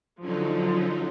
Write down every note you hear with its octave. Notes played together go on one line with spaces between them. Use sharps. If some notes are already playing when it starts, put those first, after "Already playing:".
D3 F3 F#3 C#4 D#4